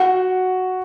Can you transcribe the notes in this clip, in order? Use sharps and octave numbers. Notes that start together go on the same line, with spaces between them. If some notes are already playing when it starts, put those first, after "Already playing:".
Already playing: F#4